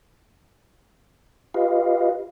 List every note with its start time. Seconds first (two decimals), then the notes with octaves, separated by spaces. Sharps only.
1.54 F4 G4 B4 D#5 F5